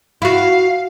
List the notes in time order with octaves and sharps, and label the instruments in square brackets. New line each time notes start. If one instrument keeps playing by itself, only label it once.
[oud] E4 F#4 [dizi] F5